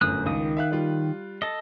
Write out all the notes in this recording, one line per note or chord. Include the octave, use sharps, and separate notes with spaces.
G1 F#2 A2 D#6 F#6
C#2 D#3 D#6
E5 F5 F#6
G3 F4
A4 D#5